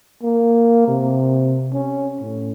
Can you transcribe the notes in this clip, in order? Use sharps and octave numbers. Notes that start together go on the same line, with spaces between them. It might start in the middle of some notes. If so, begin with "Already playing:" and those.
A#3
C3
C#4
A2